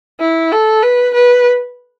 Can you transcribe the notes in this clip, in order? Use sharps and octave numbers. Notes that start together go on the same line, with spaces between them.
E4
A4
B4
B4